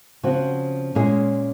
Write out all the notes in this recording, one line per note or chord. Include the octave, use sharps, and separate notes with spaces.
C#3 F3 C4 F#4
A#2 G#3 C#4 G#4